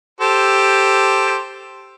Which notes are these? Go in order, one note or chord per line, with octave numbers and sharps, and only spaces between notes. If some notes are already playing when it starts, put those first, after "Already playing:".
G4 A4 C5